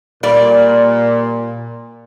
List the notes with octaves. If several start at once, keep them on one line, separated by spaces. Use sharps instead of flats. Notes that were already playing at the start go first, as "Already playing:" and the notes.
A#2 G3 D5